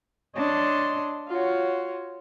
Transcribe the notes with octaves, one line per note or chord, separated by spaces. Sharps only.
D4 C#5 D#5 A5 C6
F4 F#4 C#5